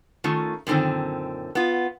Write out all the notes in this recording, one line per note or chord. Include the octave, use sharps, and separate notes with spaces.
D#3 A3 C#4 F4
F#2 A#2 D3 D#3 C4
B3 F4